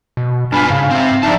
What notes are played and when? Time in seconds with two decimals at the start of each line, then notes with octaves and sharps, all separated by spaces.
0.17 B2
0.52 G2 B3 D4 F4 G#5 B5 F6
0.70 G#2 C#3 F5
0.91 C4 E5
1.23 F3 D4 D#4 D5 E5 A5 A#5